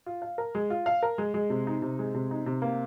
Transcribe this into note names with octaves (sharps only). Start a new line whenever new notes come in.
F4
F5
A#4
G#3
F4
F5
A#4
G#3
G#3
C3
D#4
C3
G#3
C3
D#4
C3
A#3